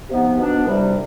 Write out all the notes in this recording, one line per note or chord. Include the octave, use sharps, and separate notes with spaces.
C3 F3 B3 D#4
B2 B3 D4
C2 C3 G3